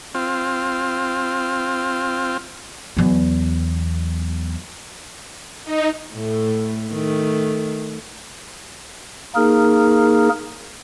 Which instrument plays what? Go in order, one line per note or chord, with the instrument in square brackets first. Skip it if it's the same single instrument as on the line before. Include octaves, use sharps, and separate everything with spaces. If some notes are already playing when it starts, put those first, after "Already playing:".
[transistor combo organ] C4 F4
[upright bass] E2 F#3
[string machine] D#4
[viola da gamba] A2 A3
D#3 A3
[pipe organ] A#3 D#4 G#4 A#4